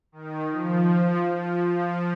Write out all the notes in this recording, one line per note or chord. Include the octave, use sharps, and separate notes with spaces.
D#3
F3
F3
F3